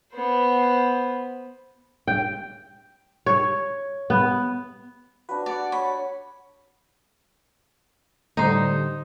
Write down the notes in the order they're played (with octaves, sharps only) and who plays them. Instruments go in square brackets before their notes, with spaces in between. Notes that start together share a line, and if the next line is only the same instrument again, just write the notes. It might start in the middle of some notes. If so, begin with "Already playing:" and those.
[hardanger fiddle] B3 C5
[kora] G5
C#5
B3
[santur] D4 F#4 [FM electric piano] B4
[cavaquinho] D5 [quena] F#5
[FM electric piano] C#5 [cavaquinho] B5
[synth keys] A2 D3 G3 [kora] D#4 C5